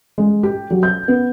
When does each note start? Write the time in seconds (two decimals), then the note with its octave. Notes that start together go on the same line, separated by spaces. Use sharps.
0.18 G#3
0.43 G4
0.70 F#3
0.83 G6
1.08 B3